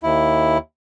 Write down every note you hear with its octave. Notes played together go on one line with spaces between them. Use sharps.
D#2 E4